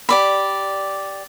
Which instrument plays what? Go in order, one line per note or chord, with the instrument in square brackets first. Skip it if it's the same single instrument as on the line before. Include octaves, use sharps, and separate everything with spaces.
[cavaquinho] G4 D5 B5